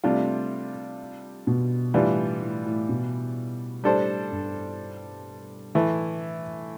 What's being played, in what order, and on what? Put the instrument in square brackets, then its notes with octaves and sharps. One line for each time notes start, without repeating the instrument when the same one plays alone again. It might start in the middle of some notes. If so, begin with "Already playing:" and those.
[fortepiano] C3 G3 D4 F4 [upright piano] A3
[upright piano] B2
[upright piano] A2 [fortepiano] E3 G3 D4 F4
[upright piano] A2
A2
B2
[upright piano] A2 [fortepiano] G3 D4 A4 C5
[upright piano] G2
[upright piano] A2 [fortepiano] E3 A3 E4